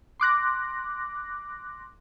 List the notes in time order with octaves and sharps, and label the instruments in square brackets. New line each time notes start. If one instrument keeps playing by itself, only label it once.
[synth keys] C6 D6 F#6 A#6